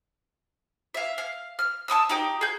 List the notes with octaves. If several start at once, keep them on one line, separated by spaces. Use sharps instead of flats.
E5 F5
F5
F6
A5 C#6 D#6 E6
D#4 G4 G5
G#4 G6